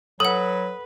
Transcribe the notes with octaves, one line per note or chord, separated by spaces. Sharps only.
F#3 A4 B4 F#5 D#6